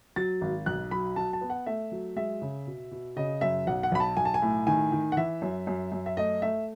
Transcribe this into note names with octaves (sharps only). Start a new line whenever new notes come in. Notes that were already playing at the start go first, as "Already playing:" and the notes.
F#3 A6
G#1
B1 F#6
F#3 B5
F#3 A5
A5
B3
F#5
A3 E5
F#3
G#3 E5
C#3
B2
B2
C#3 D#5
F#2 E5
B1 F#5
F#5
B1 B5
A5
B1 G#5
A5
G#5
A2
D#3 G#5
D#3
F#5
E3 E5
F#2
F#2
F#2
E5
A3 D#5
A3 E5